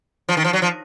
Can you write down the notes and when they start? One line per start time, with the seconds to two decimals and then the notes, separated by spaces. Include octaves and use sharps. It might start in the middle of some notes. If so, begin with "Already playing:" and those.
0.29 F3
0.37 D#3
0.45 F3
0.53 F#3
0.62 F3